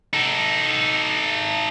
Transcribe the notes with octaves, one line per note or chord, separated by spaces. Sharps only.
D#4 A4